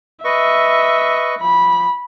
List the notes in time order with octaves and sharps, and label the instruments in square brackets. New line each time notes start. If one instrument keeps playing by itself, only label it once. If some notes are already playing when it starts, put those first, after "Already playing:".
[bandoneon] B4 D#5 C#6 [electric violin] E5
[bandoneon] F3 [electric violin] B5